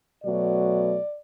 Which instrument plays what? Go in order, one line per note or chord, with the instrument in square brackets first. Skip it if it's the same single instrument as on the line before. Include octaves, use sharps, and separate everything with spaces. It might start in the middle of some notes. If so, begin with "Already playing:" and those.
[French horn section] B2 F#3 A3 D5